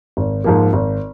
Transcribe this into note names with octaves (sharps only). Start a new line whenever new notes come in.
G#1
G#2 F3 A#3
G#1